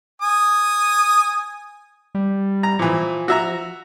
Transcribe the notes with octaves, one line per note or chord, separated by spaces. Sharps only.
G#5 D#6
G3
A#5
A#2 E3 F3
F#4 E5 A#5